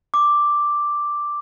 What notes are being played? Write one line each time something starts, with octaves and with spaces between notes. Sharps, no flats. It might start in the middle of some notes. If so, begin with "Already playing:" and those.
D6